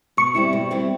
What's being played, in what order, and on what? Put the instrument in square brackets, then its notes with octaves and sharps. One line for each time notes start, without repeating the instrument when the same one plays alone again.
[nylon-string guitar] B2 [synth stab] C#6
[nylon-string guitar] G3 C4 E4
B2
G3 C4 E4